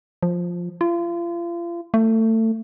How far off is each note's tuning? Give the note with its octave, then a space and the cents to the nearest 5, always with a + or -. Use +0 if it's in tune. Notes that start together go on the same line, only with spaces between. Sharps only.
F3 +5
F4 -35
A3 +25